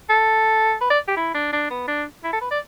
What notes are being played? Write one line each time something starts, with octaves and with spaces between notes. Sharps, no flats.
A4
B4
D5
G4
E4
D4
D4
B3
D4
E4
A4
B4
D5